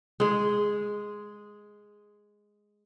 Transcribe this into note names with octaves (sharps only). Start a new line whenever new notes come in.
G#3 G#4